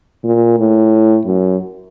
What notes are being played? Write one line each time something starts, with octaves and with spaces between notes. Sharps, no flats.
A#2
A2
F#2